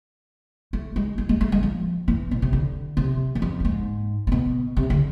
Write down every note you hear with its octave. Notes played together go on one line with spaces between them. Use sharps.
A3
G#3
G#3
G#3
A3
G#3
F3
E3
B2
C3
D3
C3
E2
F2
A2
G#2
C3
B2
C3
D3